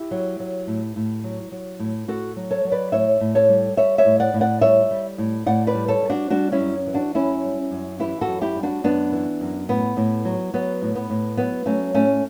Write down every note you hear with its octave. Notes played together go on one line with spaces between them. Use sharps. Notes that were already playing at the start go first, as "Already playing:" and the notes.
Already playing: E4 G4
F#3
F#3
A2
A2
F#3
F#3
A2
A2 F#4 A4
F#3
A4 C#5
F#3
B4 D5
A2 C#5 E5
A2
A4 C#5
G3
G3 C#5 E5
C#5 E5
A2
D5 F#5
A2
D5 F#5
G3 C#5 E5
G3
A2
A2 D5 F#5
B4 D5
G3
A4 C#5
G3
D4 F#4
G3 D4 F#4
C#4 E4
F#2
E3
D4 F#4
F#2 C#4 E4
G3
F#2
E3 E4 G4
F#4 A4
F#2
E4 G4
G3
D4 F#4
F#2 B3 D4
E3
F#2
A2 B3
A2
F#3
F#3 B3
A2
B3
A2
F#3 B3
F#3 A3 C#4
A2 A3 C#4